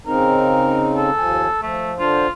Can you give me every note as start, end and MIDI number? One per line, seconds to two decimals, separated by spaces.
0.07 1.10 49
0.07 1.10 60
0.07 1.10 63
0.07 0.88 70
0.96 1.60 69
1.18 1.48 39
1.18 1.48 53
1.18 1.48 80
1.62 1.98 53
1.62 1.93 57
1.98 2.27 50
1.98 2.27 62
1.98 2.30 65
1.98 2.27 72